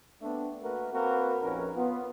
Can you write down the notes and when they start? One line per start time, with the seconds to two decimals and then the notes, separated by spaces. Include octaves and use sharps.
0.22 A3 B3 C4 D4
0.62 A3 A#3 F#4 A#4 B4
0.93 A#3 C4 F#4 A#4 B4
1.43 A#1 F2 C#4 D#4 A#4 B4
1.75 B3 F4